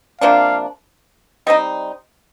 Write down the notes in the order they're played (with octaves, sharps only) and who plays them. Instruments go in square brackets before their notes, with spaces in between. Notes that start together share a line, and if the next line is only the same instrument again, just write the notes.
[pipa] C3 F3 A#3 D4 [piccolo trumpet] F5
[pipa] G3 C4 D#4 [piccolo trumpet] D#5